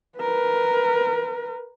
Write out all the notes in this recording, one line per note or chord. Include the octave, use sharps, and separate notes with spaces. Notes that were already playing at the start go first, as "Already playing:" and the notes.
A#4 B4